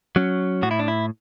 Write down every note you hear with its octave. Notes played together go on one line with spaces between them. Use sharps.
F#3 C#4
A2 F#4
E4
D4
E4